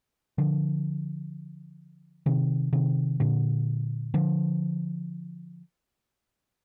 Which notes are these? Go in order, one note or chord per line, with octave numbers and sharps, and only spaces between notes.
D3 F3
C3 D#3
C3 D#3
A#2 D3
D3 F3